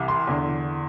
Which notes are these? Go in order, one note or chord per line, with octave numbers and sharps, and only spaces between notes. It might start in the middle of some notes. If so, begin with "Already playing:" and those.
Already playing: C2 C3 E3
C6
E2 D3